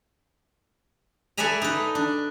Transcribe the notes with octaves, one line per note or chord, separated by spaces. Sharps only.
A4 B4 D5 E5 G#5 A#5
D#4 B4
D4